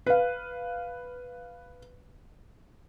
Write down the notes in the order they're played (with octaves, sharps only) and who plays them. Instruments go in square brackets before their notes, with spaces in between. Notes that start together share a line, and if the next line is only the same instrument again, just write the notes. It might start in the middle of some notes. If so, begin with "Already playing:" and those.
[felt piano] B4 F5